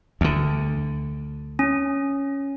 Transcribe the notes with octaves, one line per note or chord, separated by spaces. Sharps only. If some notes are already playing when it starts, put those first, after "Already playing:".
D2 D3
C#4